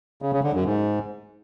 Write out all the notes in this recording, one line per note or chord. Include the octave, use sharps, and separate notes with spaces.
C#3
C#3
D3
F#2
G#2